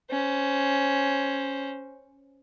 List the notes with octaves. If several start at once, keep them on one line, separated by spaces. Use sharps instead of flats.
C#4 C5